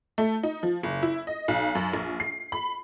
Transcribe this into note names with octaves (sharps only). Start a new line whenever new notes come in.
A3
D#4
F3
F#1
E4
D#5
B1
F#2
A#1
C7
B5